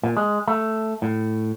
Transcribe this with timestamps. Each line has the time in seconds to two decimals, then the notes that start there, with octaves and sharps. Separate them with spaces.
0.03 A#2
0.17 G#3
0.48 A3
1.02 A2